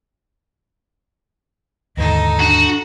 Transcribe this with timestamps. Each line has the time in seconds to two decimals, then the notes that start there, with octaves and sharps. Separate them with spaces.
1.97 D#2 G#2 D3 D#4 A4 D#5
2.40 D4 F#4